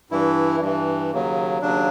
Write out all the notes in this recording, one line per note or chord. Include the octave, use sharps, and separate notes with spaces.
G2 E3 E4
G2 E3
D#2 C#3 F#3
D#2 C#3 F#3 D4